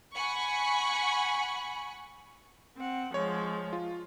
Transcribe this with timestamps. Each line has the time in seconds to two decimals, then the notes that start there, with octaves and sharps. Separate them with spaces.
0.13 F#5 G#5 B5 C#6
2.77 C4 F#5
3.14 F3 G#3 C#5
3.73 F4